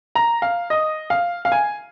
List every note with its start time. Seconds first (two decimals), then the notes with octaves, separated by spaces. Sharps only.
0.15 A#5
0.42 F5
0.70 D#5
1.10 F5
1.45 F5
1.52 G#5